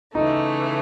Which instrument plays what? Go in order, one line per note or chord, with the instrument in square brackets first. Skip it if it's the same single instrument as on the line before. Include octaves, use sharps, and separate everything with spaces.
[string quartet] C#3 E3 A3 [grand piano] D#4